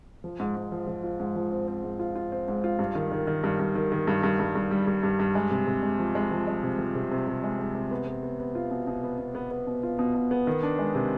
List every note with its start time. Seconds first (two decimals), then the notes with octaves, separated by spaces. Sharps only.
0.24 F3
0.39 G#2
0.56 G#2
0.72 F3
0.87 F3
1.04 F4
1.20 G#2
1.36 F3
1.51 C4
1.68 C4
1.84 G#2
2.00 F4
2.16 F4
2.32 C4
2.48 G#2
2.64 F4
2.79 G2
2.95 D#3
3.12 D#3
3.27 D#3
3.44 G2
3.59 G2
3.75 D#3
3.92 D#3
4.07 G2
4.23 G2
4.39 G2
4.55 G2
4.71 G3
4.87 G3
5.03 G2
5.20 G2
5.35 G#3
5.51 C3
5.67 C3
5.83 G#3
5.99 F3
6.15 G#3
6.31 F3
6.48 G#3
6.63 C3
6.79 F3
6.95 C3
7.11 C3
7.27 C3
7.44 G#3
7.59 G#3
7.75 C3
7.91 B3
8.07 B3
8.23 B3
8.39 B3
8.55 F4
8.71 B2
8.87 B2
9.03 B3
9.19 B2
9.35 B3
9.51 B3
9.67 B2
9.83 F4
9.99 B2
10.15 B2
10.31 B3
10.47 D#3
10.63 D4
10.79 G#3
10.95 C3